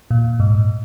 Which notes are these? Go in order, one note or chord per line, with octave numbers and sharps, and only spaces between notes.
A#2
G#2